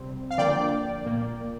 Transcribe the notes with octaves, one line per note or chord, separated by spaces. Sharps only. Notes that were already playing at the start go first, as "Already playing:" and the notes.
Already playing: C3 G3 C4
F5
D3 F3 A#3 D5 G5
A#2 A#3